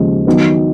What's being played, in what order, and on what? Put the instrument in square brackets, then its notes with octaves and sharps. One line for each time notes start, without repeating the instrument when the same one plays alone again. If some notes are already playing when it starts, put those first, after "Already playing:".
Already playing: [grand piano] D#2 C#3 F3 G#3
D#3 F#3 B3